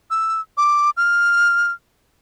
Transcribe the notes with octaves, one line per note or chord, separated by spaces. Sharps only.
E6
D6
F6